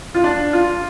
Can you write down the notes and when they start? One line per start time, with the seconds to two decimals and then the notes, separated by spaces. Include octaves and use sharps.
0.15 F4
0.24 D4
0.53 F4